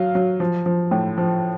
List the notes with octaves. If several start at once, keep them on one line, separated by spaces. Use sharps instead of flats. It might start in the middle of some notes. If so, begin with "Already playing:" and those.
Already playing: F#3 F5
F#3
F3
F3
A2
F3